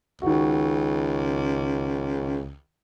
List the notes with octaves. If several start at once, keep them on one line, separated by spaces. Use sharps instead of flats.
C#2 D#3 F#4